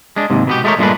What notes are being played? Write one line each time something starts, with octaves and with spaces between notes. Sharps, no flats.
G#3 D4
D#2 G#2 C3
B2 B3 G4
G#3 A3 F4 G4 A#4 C#5
G2 A#2 G#3 A3 D4 B4